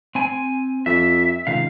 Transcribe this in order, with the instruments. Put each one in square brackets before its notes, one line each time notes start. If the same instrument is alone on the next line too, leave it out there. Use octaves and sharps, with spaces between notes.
[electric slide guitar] C4 G#5
[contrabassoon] F2 [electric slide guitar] E5
[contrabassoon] C#2 [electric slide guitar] C3 D#3 F5